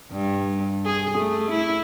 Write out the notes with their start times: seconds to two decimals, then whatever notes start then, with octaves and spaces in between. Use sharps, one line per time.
0.12 G2
0.85 G#4
1.17 A3
1.50 E4